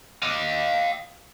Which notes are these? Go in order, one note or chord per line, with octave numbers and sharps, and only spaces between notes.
D#5 F5